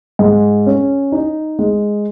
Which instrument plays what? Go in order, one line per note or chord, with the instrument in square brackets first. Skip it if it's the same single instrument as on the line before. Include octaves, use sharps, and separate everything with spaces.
[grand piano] G#2
C#4
D#4
G#3